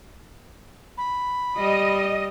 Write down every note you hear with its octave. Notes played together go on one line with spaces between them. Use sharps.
B5
G3 D#5